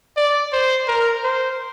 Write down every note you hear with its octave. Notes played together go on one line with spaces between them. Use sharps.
D5
C5
A#4
C5